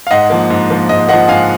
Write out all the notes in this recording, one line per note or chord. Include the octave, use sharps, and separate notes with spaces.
F5
G#2 D#5 F#5
F3 A#3
G#2
F3 A#3
G#2 D#5
F3 A#3 D#5 F#5
G#2 F5 G#5